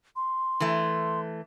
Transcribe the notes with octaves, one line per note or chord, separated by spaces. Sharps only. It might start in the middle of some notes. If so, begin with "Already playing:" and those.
C6
E3 A3